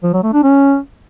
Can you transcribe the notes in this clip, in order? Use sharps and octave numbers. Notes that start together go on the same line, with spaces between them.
F3
F#3
A3
D4
C#4